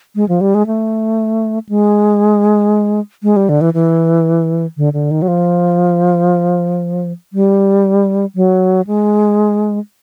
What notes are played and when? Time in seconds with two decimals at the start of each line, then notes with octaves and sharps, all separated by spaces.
0.16 G#3
0.29 F3
0.41 G3
0.54 G#3
0.67 A3
1.69 G#3
3.23 G#3
3.36 G3
3.49 D3
3.61 E3
3.74 E3
4.77 D3
4.93 D3
5.11 D#3
5.22 F#3
5.28 F3
7.33 G3
8.35 F#3
8.87 G#3